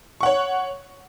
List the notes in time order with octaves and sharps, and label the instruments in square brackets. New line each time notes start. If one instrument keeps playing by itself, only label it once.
[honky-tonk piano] C#6
F#5
C#5